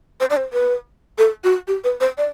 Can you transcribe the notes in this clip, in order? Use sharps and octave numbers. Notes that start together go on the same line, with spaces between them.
C5
D5
C5
B4
A4
F#4
G4
B4
C5
D5